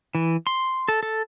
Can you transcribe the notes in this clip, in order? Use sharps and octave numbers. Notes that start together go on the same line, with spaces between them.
E3
C6
A4
A4